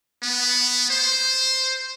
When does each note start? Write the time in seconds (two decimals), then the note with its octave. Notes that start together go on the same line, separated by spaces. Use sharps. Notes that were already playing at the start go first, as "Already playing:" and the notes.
0.22 B3
0.90 C5